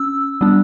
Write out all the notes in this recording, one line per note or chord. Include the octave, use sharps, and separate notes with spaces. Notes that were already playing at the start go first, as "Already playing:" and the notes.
Already playing: C#4 E6
G3 B3 D4